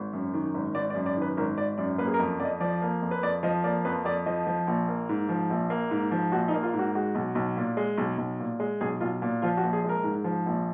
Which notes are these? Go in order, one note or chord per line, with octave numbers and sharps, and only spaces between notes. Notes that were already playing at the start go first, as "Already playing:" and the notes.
Already playing: G#1
F#2
D#3
G#1
G#1 D5
D5
F#2
D5
D#3 B4
G#1 A#4
G#1 D5
F#2 D5
A#3 B4
G#4
A#4
F2
F2 D5
D#5
F3 D5
A#3
F2
B4
F2 D5
F3 D#5
A#3 D5
F2 B4
F2 D5
F3 D#5
F3
A#1
A#3
G#2
F3
A#1
A#3
G#2
F3
A#1 F#4
D#4
A#3
F4
G#2
F#4
G#3 F#4
B1
B1
A#2
G#3
B1
B1
A#2
G#3
B1 G#4
B1 F4
A#2
F3 F4
F#4
A#1
G#4
G#3 A#4
G#2
F3
A#1